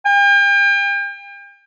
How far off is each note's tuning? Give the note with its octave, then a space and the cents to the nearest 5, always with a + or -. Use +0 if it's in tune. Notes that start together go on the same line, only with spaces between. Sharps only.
G5 +40